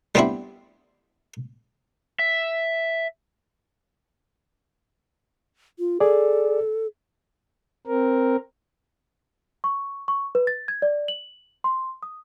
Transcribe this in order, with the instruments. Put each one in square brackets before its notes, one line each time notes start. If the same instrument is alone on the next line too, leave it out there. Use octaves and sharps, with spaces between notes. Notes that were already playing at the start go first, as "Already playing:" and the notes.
[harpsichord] G3 B3 C4 D4 E4
[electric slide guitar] E5
[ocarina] F4
[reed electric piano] G#4 D5 [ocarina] A4
[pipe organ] C4 A#4
[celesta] C#6
C#6
B4
A6
G#6
D5
F#7
C6
D#6